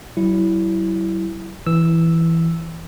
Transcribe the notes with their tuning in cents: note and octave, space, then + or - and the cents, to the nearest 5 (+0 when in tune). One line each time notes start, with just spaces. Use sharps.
F#3 +40 E4 +0
E3 +0 E6 +0